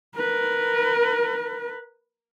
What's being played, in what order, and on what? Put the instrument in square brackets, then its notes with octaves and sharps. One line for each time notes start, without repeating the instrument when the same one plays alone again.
[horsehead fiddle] A#4 B4